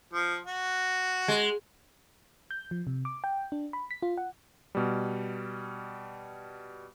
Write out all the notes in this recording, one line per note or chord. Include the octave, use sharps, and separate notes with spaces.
F3
F#4
G#3
G6
F3
C3
D6
G5
D4
B5
B6
F4
F#5
B2 G3